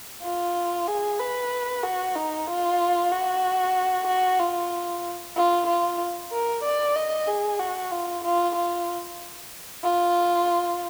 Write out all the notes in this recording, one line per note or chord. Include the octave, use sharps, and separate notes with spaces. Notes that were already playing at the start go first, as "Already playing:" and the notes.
F4
G#4
B4
F#4
D#4
F4
F#4
F#4
F4
F4
F4
A#4
D5
D#5
G#4
F#4
F4
F4
F4
F4